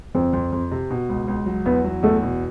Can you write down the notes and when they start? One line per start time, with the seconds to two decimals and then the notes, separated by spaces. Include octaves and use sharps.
0.15 F2 C4
0.33 F2
0.53 F2
0.71 C3
0.90 B2
1.09 C#2
1.28 C#2
1.46 F#3
1.66 E2 B3
1.84 F#3
2.03 E2 A3
2.22 B2